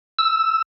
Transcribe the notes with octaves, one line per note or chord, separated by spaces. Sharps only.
E6